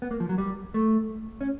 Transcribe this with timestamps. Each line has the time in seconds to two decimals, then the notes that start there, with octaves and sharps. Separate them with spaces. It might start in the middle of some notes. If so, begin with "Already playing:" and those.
0.02 B3
0.11 A#3
0.20 F3
0.29 F#3
0.38 G3
0.74 A3
1.41 C#4